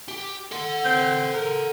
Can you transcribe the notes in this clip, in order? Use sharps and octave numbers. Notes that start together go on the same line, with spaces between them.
G4
A4 F#5
C4
A#4